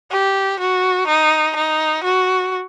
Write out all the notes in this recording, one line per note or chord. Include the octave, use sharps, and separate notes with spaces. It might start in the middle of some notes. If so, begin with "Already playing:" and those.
G4
F#4
D#4
D#4
F#4